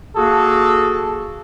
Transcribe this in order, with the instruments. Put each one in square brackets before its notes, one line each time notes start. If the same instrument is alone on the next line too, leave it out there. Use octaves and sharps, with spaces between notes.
[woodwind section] A#3 F#4 G#4 [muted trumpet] A4